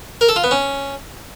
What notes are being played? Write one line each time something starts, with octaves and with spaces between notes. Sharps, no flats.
A#4
A4
F4
B3
C#4